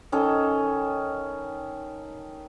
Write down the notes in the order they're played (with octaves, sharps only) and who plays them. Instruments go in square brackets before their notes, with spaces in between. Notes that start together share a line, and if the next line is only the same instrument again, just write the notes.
[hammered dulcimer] D#3 C#4 A4 D#5